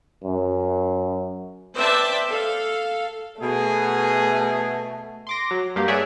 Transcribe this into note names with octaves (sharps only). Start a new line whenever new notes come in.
F#2
B4 C5 D5 E5 G5 A5
A4 F5
B2 A3 G#4
C6 D6 A#6
F#3
G2 A#3 G4
G#4 C#5 D5 E5 F#5 G#5